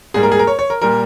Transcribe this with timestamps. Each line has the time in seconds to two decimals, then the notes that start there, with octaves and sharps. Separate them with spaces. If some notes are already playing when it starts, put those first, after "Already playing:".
0.14 G#2 G3 A#3 G#4
0.23 A#4
0.32 G#4
0.39 A#4
0.47 C#5
0.59 C#5
0.70 A#4
0.82 A#2 G3 A#3 A#4